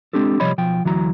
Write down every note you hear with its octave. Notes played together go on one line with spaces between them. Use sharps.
G#3 C4 D4 G4 A4
C3 F3 G3 C#5 D#5 B5
B1 F3 G5
D2 E3 F#3 E4 A#5